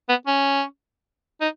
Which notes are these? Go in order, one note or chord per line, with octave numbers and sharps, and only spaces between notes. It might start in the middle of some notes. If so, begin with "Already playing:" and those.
B3
C#4
D#4